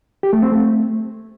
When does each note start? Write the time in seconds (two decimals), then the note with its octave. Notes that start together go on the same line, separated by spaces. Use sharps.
0.23 G4
0.33 A3
0.42 C4
0.52 A3